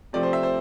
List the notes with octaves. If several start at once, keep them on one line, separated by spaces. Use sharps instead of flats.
C3 F3 A3 C4 D5
C5
E5
C5